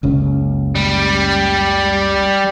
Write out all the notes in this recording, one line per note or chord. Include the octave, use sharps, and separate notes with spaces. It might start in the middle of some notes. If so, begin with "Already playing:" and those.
F#1 C#2 C#4
G3